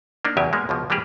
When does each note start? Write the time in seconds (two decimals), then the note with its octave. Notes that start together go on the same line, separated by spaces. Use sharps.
0.25 A#3 D4 D#4
0.37 E2 C#3 F#3 G4 G#5
0.53 G#3 A#3 B3
0.69 C#2 B2 F3
0.90 E3 G3 A#3 G4 G#4